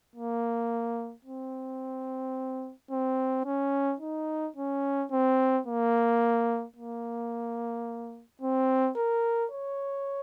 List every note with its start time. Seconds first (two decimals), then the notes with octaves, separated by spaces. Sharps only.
0.16 A#3
1.25 C4
2.91 C4
3.45 C#4
4.00 D#4
4.56 C#4
5.11 C4
5.67 A#3
6.76 A#3
8.41 C4
8.97 A#4
9.51 C#5